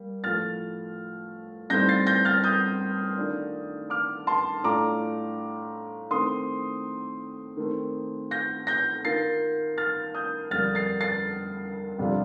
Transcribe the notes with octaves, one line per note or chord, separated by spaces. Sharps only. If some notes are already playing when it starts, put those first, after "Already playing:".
Already playing: G3 A#3
A2 F3 A3 F6 A6
A2 G3 C4 D#4 G6 A#6
A6 C7
G6 A#6
F6 A6
D#6 G6
D#3 A3 D4 F4
D6 F6
A5 C6
A2 A3 D4 F4 A#5 D6
D#3 A3 C4 C6 D#6
D#3 A3 C4
G6 A#6
G6 A#6
D#3 A#3 F4 A6 C7
F6 A6
D#6 G6
F2 D3 G3 A#3 F6 A6
A6 C7
A6 C7
F2 C3 G3 D4 F4